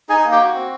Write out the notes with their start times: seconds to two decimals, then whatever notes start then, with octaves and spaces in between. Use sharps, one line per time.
0.09 D#4 G#4 G#5
0.24 A#3
0.32 G4 G5
0.40 F#4
0.54 C4